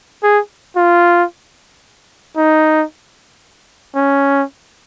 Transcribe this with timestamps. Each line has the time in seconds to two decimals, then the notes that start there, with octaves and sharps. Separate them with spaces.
0.23 G#4
0.76 F4
2.36 D#4
3.95 C#4